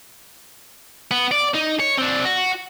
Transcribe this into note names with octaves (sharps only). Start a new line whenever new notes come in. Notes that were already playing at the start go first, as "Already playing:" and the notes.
B3
D5
D#4
C#5
C4 D4
F#4